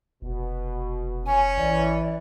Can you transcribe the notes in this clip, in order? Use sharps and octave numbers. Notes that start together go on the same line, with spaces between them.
F1 B2
C#4 G#5
A1 E3 D5